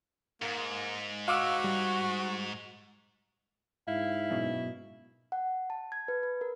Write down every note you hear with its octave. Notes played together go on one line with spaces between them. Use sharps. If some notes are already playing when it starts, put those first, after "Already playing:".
G#2 A#3
F#4 F5 D6 E6
G3
G#2 E4 F5
F#2 B2
F#5
A5
G#6
B4
B4
A#4